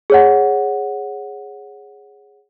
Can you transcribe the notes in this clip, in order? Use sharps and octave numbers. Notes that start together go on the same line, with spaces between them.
G#4 C#5 F#5